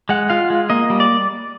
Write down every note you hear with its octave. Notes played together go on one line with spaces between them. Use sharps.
G#3 F#5
F4 F5
G#3
A#3 D#5
G3
D5